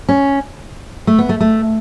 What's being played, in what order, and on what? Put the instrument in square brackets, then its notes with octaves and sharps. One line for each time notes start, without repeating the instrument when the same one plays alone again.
[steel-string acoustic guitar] C#4
A3
B3
A3
A3